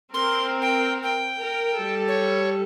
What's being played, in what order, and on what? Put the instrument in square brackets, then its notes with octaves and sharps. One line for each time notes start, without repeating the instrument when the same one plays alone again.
[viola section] C4 A#4 [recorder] C6
[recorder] G5
G5
[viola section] A#4
G3 A4
[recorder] C#5